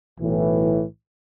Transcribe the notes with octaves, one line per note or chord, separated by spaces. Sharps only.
B1 A2 E3